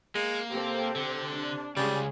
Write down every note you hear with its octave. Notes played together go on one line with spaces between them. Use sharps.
G#3 A#3
C3 C4 G4 A4
D3
D4
C#2 C#3 G3 C#4 G#4